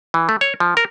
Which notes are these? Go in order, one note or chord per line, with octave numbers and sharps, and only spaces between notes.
E3
A3
C#5
F3
A#4